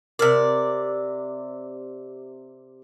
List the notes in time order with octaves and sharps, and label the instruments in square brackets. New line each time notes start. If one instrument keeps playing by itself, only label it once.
[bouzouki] C3 D5 [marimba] A#4 F6